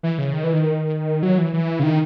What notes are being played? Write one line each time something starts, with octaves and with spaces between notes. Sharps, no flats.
E3
C#3
D#3
E3
D#3
F#3
E3
E3
C#3
D#3